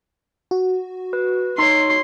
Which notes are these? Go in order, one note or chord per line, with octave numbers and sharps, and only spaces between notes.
F#4
B4
D#4 C#5 C6